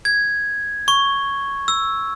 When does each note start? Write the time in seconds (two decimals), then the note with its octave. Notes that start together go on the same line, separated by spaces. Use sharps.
0.05 G#6
0.88 C#6
1.68 E6